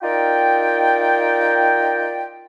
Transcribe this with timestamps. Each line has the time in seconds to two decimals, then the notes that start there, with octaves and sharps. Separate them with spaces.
0.03 D#4 F4 A#4 D5 G5